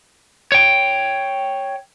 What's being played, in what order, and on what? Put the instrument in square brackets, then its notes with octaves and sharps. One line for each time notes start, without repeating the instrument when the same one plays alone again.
[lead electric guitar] C#5 G5